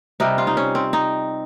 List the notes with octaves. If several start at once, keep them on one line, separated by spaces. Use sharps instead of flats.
C3 G3 D#4
F4
D#4
C#4
C4
D#4